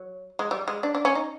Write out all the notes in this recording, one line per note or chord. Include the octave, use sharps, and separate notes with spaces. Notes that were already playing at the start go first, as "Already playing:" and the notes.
Already playing: F#3
G#3
G3
G#3
D4
D4
C#4
D#4